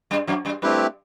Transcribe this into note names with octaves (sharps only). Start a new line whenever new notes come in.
G2 G3
F#2 F#3
G2 G3
G2 G3 A3 C4 E4 G4 B4